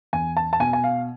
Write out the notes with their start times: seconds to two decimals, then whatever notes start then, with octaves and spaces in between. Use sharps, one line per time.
0.13 E2 G#5
0.37 A5
0.53 A5
0.60 B2 G#5
0.73 G#5
0.84 F5